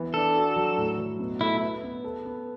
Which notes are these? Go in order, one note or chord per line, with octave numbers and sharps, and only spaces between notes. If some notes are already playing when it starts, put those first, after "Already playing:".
Already playing: E3 B3
D4 A4
F#4
F#3
A2
F#3
B2
A3 E4
B4
B3
A4
B3